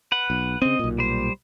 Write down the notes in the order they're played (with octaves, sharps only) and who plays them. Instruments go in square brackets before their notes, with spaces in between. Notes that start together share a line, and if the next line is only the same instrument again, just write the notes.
[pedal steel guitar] B4 F#5
[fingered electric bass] B1
[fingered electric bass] C#3 C4 [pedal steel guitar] D#5
[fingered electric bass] B1 A#2
[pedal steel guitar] G3 C5